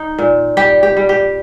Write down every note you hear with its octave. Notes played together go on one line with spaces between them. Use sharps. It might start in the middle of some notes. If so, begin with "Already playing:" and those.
Already playing: D#4
A#2
G3 G4
G4
G3
G4